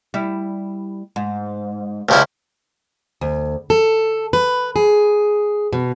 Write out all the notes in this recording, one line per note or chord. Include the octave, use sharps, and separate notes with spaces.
G3 E4
G#2
C#2 F3 E4 G4 D5
D2
A4
B4
G#4
B2